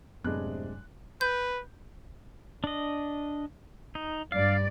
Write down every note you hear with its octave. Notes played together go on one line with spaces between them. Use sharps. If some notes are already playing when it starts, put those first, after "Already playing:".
F#2 A2 C3 G#3 B3 D4 F#6
B4 G6
D4 D#5
D#4
G2 D5 F5